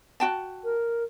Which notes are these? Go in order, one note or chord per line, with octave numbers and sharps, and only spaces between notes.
F#4 G5 A5
A#4